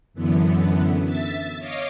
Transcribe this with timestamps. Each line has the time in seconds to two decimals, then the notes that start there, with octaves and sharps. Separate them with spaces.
0.14 F#2 D3 E3 B3
1.05 E5 A6
1.58 C#5 D#5 F5 D6